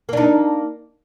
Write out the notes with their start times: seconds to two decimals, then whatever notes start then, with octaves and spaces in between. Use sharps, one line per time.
0.09 A#3
0.13 D4
0.17 D#4